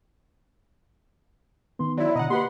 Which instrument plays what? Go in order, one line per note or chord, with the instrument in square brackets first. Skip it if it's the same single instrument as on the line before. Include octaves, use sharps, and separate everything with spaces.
[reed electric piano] D#3 B3 [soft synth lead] C6
[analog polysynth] F#3 E4 [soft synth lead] D5
[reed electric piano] B2 D3 [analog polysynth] D#5 F#5 [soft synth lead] A#5
[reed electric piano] A#3 F#4 B4 [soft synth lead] G4 [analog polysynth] F#5 B5 C6